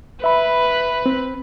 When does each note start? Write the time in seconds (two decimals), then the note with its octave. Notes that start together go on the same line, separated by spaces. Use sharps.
0.24 B4 E5 B5
1.06 C4